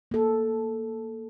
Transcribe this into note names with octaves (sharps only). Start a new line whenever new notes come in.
A#3 A4